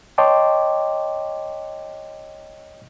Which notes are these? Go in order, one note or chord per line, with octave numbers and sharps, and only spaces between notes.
C#5 D#5 G5 A5 C6 D6